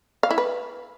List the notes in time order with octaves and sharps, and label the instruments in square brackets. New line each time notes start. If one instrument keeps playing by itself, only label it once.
[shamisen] F5
E4
B4